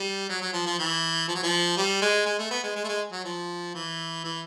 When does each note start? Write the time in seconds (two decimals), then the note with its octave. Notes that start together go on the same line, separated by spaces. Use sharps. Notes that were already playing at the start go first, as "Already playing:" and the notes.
Already playing: G3
0.29 F#3
0.42 F#3
0.53 F3
0.66 F3
0.79 E3
1.28 F3
1.35 F#3
1.43 F3
1.77 G3
2.02 G#3
2.26 G#3
2.39 A3
2.51 B3
2.63 G#3
2.76 G#3
2.84 A3
2.88 G#3
3.12 F#3
3.25 F3
3.74 E3
4.24 E3